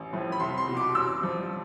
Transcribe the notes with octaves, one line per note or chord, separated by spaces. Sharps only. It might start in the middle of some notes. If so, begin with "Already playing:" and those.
Already playing: A1
A2 F3
B5
C2 C6
C6
B2 G3
D6
A1 E6
G2 F3